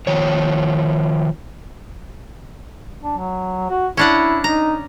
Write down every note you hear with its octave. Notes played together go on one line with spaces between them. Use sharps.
D#3 F3 C#5
D4
F#3
F#4
C#4 D4 E4 F#5
D#4 A#5